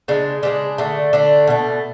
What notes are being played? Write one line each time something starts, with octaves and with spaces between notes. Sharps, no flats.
C#3 E3 G#3 D4
C#3 E3 G#3 D4
D3 A3
D3 A3 D4
B2 A3